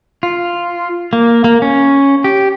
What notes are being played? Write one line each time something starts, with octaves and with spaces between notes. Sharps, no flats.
F4
A#3
A#3
C#4
G4